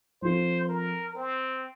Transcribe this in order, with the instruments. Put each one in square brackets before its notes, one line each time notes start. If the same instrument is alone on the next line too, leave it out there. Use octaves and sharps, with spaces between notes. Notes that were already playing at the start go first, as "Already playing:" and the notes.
[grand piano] F3 C4 F4 A4 [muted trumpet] C5
[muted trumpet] A#4
C4